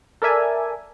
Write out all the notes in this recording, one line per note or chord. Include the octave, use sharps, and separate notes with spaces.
A4 A#4 D5 E5 G#5